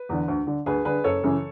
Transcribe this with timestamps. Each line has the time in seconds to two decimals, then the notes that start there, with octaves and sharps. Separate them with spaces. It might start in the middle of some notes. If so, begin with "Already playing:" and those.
Already playing: B4
0.09 E2 D3
0.28 D2
0.47 D3
0.66 D2 G#4 B4
0.85 D3 G#4 B4
1.04 F#1 A4 C#5
1.24 F#2 C#3 E3